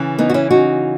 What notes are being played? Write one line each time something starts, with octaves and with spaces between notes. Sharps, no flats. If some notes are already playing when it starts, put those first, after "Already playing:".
Already playing: C#3 E3
B3 D#4
F#4
C#4 E4
D#4 F#4